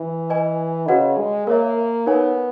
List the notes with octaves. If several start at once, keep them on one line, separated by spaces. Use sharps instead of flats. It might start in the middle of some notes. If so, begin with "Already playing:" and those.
Already playing: E3
B4 D#5 G#5
C#3 F#4 B4 D#5 F#5
G#3
A#3 A#4 C#5 E5
B3 D#4 A#4 C#5 G#5